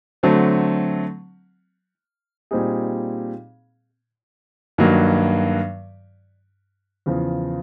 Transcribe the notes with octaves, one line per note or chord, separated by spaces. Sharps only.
D3 F#3 A3 C4
A#2 G3 C4 D#4 G#4
G2 D#3 F#3 A#3
E2 C#3 F3